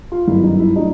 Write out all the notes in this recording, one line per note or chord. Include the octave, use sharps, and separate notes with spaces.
F4
G1 F#2 D#3 G3 E4
D#4
E4
F#3 A3 D4 D#4